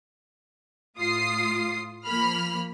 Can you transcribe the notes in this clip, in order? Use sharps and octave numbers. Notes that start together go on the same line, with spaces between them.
A2 F4 D#6 C7
F3 A#3 B5 F6